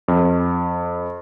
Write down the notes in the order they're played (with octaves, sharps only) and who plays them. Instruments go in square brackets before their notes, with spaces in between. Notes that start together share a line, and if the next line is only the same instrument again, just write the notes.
[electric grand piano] F2